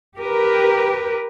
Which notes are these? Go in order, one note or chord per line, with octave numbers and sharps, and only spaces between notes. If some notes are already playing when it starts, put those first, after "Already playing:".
G4 A#4 B4